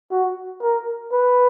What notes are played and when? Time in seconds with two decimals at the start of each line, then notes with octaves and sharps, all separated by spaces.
0.11 F#4
0.62 A#4
1.12 B4